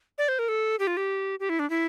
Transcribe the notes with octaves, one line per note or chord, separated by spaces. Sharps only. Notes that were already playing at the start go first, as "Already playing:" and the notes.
D5
C5
A#4
A4
G4
F4
G4
G4
E4
D4
E4